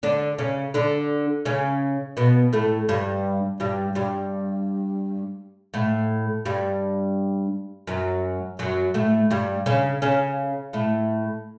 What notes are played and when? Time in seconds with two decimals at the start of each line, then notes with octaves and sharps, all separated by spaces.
0.03 D3 D4
0.38 C#3 C#4
0.74 D3 D4
1.45 C#3 C#4
2.17 B2 B3
2.53 A2 A3
2.89 G2 G3
3.60 G2 G3
3.95 G2 G3
5.74 A2 A3
6.45 G2 G3
7.87 F#2 F#3
8.59 F#2 F#3
8.94 A2 A3
9.31 G2 G3
9.66 C#3 C#4
10.02 C#3 C#4
10.73 A2 A3